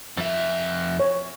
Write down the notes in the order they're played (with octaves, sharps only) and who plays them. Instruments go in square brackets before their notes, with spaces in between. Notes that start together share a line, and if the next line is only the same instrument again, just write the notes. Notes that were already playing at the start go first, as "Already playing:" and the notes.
[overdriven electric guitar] F2 E5
[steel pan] C#5